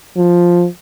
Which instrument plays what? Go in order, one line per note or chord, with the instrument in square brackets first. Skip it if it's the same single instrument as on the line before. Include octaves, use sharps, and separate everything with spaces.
[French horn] F3